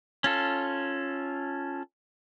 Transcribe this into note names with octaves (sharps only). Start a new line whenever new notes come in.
C#4 F4 A4